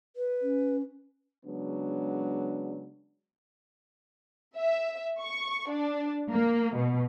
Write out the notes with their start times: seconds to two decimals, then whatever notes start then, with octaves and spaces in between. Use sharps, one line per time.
0.16 B4
0.42 C#4
1.45 C#3 F#3 G#3 B3 D4
4.56 E5
5.21 C#6
5.69 D4
6.31 A#3
6.76 B2